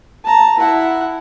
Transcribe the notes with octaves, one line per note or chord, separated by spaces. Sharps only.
A5 A#5
E4 F#5